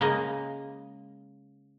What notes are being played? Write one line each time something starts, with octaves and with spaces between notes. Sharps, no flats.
C#3 G#3 A#3 D#5